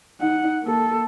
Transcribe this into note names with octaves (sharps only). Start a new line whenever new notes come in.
D#4 F#5
A#3 A4